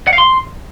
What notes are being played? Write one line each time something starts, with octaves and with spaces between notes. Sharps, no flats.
F#5
F5
C6